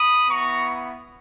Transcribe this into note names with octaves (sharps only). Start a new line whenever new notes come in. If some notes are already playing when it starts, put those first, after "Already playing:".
Already playing: B5 D#6
B3 E4 A#5 C#6